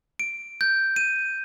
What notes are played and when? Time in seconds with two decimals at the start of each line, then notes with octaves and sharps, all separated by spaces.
0.20 D7
0.61 G6
0.96 D#7